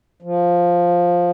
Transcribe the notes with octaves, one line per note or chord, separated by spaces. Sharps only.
F3